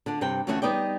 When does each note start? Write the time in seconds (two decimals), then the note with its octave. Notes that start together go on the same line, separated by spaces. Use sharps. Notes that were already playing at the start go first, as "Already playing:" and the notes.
0.06 D3 D4
0.21 G2 C3 C4 G5
0.47 D2 E3 A3 C#4 E5 F#5
0.62 G3 B3 D#4 D5 G5